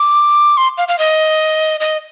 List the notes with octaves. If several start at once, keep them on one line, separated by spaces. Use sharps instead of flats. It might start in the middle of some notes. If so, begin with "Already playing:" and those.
Already playing: D6
C6
F5
F5
D#5
D#5